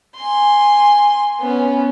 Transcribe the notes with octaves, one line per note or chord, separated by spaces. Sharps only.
G#5 C6
B3 C#4